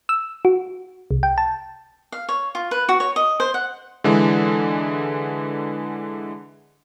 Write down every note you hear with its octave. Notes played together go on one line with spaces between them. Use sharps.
E6
F#4
C2
G5
A5
F5
C#5
F4
B4
F#4
C#5
D#5
C5
F#5
D3 E3 G#3